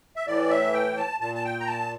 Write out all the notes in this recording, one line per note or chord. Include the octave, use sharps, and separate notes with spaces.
E5
A2 E3 D5
E5
G5
A5
A#2 A5
A5
G5
A#5
A5